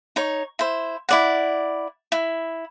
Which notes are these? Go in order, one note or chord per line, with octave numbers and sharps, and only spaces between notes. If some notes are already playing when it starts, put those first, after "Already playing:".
D#4 C#5
E4 C5
E4 D5 F#5
E4